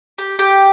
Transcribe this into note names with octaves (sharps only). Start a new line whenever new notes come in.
G4
G4